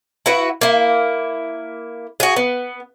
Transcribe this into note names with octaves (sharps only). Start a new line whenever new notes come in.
E4 F#4 B4
A#3 E4
F#4 G#4
B3